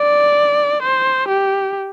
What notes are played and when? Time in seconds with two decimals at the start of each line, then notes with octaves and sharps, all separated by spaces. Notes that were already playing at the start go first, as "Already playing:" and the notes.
Already playing: D5
0.83 C5
1.28 G4